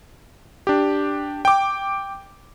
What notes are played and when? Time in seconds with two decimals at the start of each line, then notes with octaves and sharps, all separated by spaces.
0.67 D4 G4
1.45 G5 D6